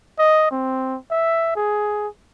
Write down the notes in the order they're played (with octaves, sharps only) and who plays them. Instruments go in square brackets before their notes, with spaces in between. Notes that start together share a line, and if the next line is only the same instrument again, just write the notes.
[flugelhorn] D#5
C4
E5
G#4